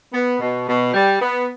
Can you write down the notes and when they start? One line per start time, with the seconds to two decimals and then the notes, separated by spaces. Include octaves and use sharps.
0.12 B3
0.39 B2
0.67 B2
0.93 G3
1.20 B3